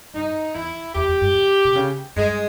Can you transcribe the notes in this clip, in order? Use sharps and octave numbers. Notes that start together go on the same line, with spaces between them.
G2 D#4
E2 E4
E2 G4
E2
G2
D#3
B2
C#3
G2 G#3